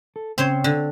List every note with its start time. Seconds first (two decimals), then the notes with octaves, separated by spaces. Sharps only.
0.16 A4
0.38 C#3 C4 C#4 C5 C#5
0.64 D3